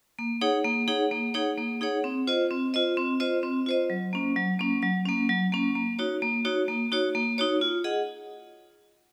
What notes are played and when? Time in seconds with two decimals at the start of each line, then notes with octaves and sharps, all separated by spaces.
0.19 A#3
0.41 D#4 G#4 C#5 F#5
0.64 A#3
0.88 D#4 G#4 C#5 F#5
1.11 A#3
1.34 D#4 G#4 C#5 F#5
1.58 A#3
1.81 D#4 G#4 C#5 F#5
2.04 C4
2.27 F4 C5 D#5
2.51 C4
2.74 F4 C5 D#5
2.97 C4
3.20 F4 C5 D#5
3.43 C4
3.66 F4 C5 D#5
3.90 F#3
4.13 A#3 C#4
4.36 F#3
4.59 A#3 C#4
4.82 F#3
5.06 A#3 C#4
5.29 F#3
5.52 A#3 C#4
5.75 A#3
5.99 D#4 F#4 C#5
6.22 A#3
6.45 D#4 F#4 C#5
6.68 A#3
6.92 D#4 F#4 C#5
7.15 A#3
7.38 D#4 F#4 C#5
7.61 F4
7.84 G#4 D#5 F#5